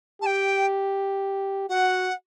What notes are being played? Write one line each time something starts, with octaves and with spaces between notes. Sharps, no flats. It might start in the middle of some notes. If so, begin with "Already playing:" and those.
G4 G5 A5
F#4 F#5